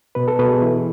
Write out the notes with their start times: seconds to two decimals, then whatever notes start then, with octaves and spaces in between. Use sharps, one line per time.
0.15 B2 B4
0.28 A4
0.39 B2 B4
0.51 G#4
0.62 E3 E4